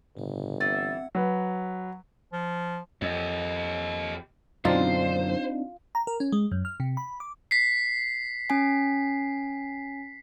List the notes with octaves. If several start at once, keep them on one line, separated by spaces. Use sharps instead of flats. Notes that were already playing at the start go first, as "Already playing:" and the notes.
G1 A2 C#3
E3 C4 F#5 A6
F#3 B4
F3
F2 G4 D#5
F#2 B2 D3 C4 D4 D#4 F4 C5
A#5
A#4
C#4
G#3
F#2
F6
C3
B5
D6
B6 C7
C#4 G#5